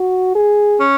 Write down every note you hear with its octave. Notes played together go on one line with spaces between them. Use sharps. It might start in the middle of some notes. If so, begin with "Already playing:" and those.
Already playing: F#4
G#4
C#4